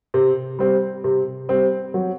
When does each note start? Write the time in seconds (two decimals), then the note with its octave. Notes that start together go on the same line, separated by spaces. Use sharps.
0.14 C3
0.59 G3 C4
1.04 C3
1.49 G3 C4
1.94 F#3